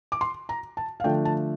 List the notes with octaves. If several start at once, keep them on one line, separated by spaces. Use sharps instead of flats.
D6
C6
A#5
A5
F5
D3 F3 A3 D4 G5
A5